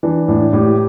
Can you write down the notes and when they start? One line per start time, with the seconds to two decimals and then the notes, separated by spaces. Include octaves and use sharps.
0.03 E3 D4
0.28 A2 D4
0.53 A2 G4